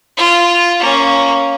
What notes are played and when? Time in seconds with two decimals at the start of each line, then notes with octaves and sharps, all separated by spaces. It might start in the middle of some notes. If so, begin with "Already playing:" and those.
0.17 F4
0.80 A#3 C#4